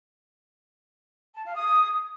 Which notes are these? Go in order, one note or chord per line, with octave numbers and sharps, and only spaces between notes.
A5
F5
D#6